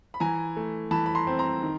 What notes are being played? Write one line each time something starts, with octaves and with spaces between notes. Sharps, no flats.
B5
E3 G#5 A#5
A3
E3 A5 B5
B5
A#5 C6
C4
A#5 C6
D#3